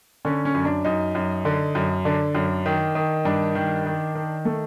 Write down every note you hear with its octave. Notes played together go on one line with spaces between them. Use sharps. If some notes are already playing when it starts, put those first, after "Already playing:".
D3 C#4
C#4
F#2
D4
F#2 D#4
F#2
D3
F#2
D3 D4
F#2
D#3
D#3
G2 D4
D#3
D#3
D#3
A3